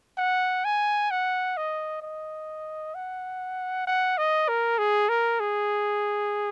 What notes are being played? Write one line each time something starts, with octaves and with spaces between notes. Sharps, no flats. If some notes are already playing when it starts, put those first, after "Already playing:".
F#5
G#5
F#5
D#5
D#5
F#5
F#5
D#5
A#4
G#4
A#4
G#4